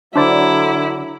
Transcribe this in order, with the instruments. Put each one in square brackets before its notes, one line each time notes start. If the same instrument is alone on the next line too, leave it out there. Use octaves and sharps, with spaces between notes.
[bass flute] D3 [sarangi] F#3 [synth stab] D4 C5 D5 [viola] E4